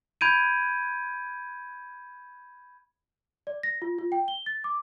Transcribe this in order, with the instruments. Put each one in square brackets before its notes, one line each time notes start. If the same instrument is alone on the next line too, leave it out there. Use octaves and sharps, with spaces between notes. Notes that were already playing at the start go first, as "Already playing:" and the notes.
[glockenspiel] B5 G6 G#6 D7 D#7
[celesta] D5
A#6
F4
F4
G5
G7
A6
D6